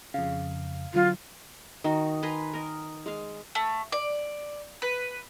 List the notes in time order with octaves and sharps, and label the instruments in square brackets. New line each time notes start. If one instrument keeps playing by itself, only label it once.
[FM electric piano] F2 C#3 [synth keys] F5
[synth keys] D3 F#3 [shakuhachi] F4
[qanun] D#3 D#4 F#4
B4 G#5 A#5 C6
A#4 D#5
G#3 F5
[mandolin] A3
D5
B4